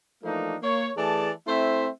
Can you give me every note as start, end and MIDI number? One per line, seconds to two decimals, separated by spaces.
0.23 0.55 52
0.23 0.55 53
0.23 0.55 57
0.23 0.55 58
0.23 0.55 62
0.23 0.55 63
0.62 0.90 58
0.62 0.90 73
0.96 1.31 52
0.96 1.31 57
0.96 1.31 68
0.96 1.31 74
0.96 1.31 81
1.47 1.89 57
1.47 1.89 60
1.47 1.89 64
1.47 1.89 72
1.47 1.89 76